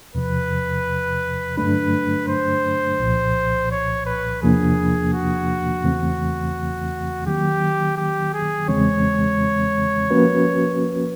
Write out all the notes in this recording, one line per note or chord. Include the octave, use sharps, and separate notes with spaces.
E2 C3 F3 B4
G2 D3 F#3 A3 D4 B4
C5
C2 A#2 F3
C#5
B4
E2 C3 F3 A#3 D4 G#4
F#4
E2 C#3 E3 A3 C4
D#3 F#3 A#3 G4
G4
G#4
E2 C#3 E3 G#3 C4 C#5
F3 A#3 C#4 F#4 B4